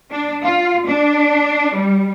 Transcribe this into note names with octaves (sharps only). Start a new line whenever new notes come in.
D4
F4
D4
G3